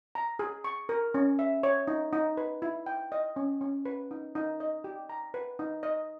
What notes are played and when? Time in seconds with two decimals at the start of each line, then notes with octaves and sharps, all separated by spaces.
0.15 A#5
0.39 G#4
0.64 C#6
0.89 A#4
1.14 C#4
1.39 E5
1.63 C#5
1.88 D#4
2.13 D#4
2.37 B4
2.62 E4
2.86 G5
3.12 D#5
3.36 C#4
3.61 C#4
3.85 B4
4.11 D#4
4.35 D#4
4.60 D#5
4.84 G4
5.10 A#5
5.34 B4
5.59 D#4
5.83 D#5